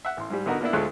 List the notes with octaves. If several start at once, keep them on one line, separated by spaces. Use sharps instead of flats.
E5 F#5
A1 C6
G#2 G3
D3 B3 D#4 F#4 A#4
A#3 B3 D4 E4
D2 G#3 F4 A4 C#5 F#6